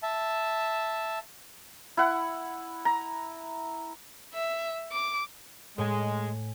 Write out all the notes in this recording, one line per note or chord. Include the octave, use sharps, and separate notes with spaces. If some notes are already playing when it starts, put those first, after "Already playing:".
E5 A5
E4 F#5
A#5
E5
D6
A2 G#3 G#5